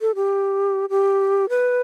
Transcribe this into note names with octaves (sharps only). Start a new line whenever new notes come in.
A4
G4
G4
B4